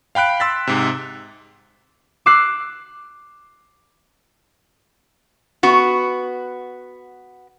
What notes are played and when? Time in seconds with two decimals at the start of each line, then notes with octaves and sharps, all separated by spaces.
0.15 F5 G5 B5 F#6 D7
0.40 C6 E6 A6 B6
0.67 G#2 C3
2.26 D6 E6 F#6 C7
5.63 B3 F#4